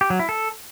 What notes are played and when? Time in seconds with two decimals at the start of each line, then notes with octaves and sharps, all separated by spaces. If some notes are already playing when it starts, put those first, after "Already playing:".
0.01 G4
0.10 F#3
0.19 E4
0.29 A4